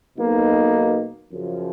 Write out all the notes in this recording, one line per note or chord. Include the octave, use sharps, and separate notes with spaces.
B1 B2 A#3 D#4
F#2 C#3 F3